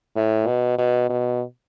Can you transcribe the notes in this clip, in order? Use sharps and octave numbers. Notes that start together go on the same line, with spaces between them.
A2
B2
B2
B2